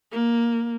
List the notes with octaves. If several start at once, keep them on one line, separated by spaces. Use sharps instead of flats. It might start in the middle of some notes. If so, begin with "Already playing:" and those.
A#3